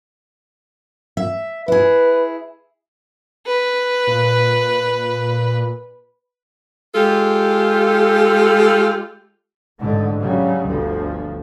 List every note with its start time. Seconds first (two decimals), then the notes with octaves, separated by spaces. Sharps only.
1.17 E5
1.68 E4 G#4 B4
3.46 B4
4.07 A#2
6.95 G#3 F4 G4 A4
9.80 A1 G#2 D3 A3
10.19 C#3 F#3 G3
10.67 G1 D2 F3